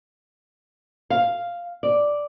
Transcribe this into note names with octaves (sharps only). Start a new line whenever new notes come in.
F5
D5